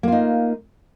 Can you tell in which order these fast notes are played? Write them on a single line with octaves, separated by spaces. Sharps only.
A#3 F4 D#4